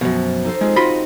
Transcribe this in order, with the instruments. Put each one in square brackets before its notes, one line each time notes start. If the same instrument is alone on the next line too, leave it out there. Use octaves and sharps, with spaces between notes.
[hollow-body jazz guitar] F#2 B2 [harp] F3
[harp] D#4 A4 C5
[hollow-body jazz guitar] G#3 [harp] C4 F4 G#4
[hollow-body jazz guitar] F4 B5 C6 [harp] F#4 D#5